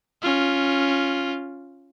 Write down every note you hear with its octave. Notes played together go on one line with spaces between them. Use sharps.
C#4 F4